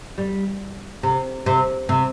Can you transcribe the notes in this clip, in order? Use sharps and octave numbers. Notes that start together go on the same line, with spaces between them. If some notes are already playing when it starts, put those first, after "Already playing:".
G3
C3
C3
C3